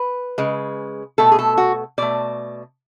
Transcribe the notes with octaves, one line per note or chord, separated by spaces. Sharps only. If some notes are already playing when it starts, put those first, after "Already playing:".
Already playing: B4
C#3 G#3
B2 A3 A4
G#4
A4
F#4
B2 A3 D5